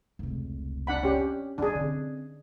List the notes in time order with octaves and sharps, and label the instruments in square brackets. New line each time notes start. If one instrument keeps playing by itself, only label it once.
[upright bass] F1 C#2
[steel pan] D4 F#5 B5
C#4 G4
[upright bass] F3 F4 [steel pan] D4 G#4
[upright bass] D3 C4